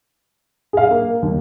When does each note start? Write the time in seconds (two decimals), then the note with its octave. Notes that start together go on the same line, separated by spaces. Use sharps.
0.73 G#4 F5
0.91 A#3
1.22 D#2